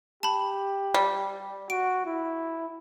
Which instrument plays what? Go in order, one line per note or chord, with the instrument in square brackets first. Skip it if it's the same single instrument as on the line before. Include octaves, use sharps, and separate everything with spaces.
[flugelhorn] G4 [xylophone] A5 B5
[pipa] G3 [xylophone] D5
[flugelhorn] F#4 [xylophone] D7
[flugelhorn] E4